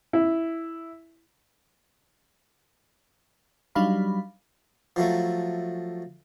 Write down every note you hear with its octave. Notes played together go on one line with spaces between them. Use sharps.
E4
F#3 G3 D4 D#4 F5 B5
F3 F#3 A3